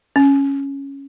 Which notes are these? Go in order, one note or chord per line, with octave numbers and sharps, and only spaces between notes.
C#4